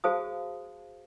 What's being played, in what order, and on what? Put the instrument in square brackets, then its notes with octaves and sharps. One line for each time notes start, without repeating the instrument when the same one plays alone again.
[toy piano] F#4 G#4 C5 F5 A5 D#6